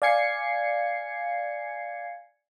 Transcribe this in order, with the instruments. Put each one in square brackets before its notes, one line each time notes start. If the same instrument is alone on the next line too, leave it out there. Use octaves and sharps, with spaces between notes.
[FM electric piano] D5 F5 G#5 G#6 C7 C#7